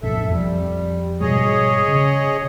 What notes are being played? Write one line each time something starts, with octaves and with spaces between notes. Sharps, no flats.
A#1 F2 A2 A4 E5
F2 F3 G3
G#2 B2 G3 G#4 C#5 D#5
C#3